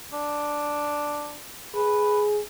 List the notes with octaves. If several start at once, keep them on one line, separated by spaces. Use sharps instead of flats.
D4
G#4 B4